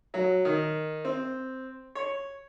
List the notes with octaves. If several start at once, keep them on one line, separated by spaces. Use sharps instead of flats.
F#3
D#3
C4
C#5